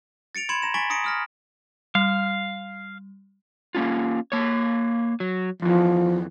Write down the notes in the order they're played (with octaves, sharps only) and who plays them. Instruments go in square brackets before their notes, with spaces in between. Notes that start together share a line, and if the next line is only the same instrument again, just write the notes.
[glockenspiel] A6 C#7 D7 F7
B5 C6 G#6 C#7 E7 F#7
A#5 A#6 E7
G#5 C#6 A6 B6 D7 F#7
A#5 D#6 A#6 C#7 D7
D#6 F6 A#6
[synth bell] G3 [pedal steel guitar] F5
[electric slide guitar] A#3 C#4 F4
A#3 C#5
F#3
[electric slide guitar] F2 E3 [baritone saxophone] F3